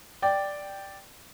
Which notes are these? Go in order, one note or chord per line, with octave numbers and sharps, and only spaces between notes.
D5 G5